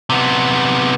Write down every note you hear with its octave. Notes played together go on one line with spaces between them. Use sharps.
C3 B3